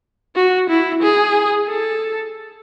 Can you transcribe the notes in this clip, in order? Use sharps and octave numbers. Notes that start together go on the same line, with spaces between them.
F#4
E4
G#4
A4